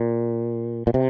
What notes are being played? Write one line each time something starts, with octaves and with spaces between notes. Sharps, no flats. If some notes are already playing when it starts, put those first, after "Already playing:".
Already playing: A#2
A#2
C3